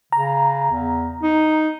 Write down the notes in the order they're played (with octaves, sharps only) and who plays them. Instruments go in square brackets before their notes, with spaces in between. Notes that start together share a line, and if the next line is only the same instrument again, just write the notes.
[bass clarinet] C#3 [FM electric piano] A#5
[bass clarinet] E2
D#4